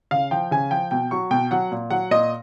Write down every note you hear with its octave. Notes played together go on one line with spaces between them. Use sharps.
C#3 F5
F3 G5
C#3 G#5
F3 G5
B2 G5
F#3 C#6
B2 G5
F#3 F#5
A#2
F#3 F#5
A#2 D#5